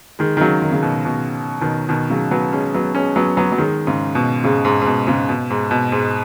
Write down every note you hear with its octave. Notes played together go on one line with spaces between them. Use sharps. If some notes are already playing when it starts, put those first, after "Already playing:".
D#3 G#3
D#3
C#3 F#3
D#3
C#3
B2
B2
B2 D#3
B2 D#3
C#3 F#3
F#3 B3
G#3 C#4
F#3 B3
G#3 C#4
F#3 B3
F#3 B3
F#3
D#3 G#3
G#2 C#3
B2
G#2 C#3
G#2
G#2
B2
G#2 C#3
B2
G#2
B2
G#2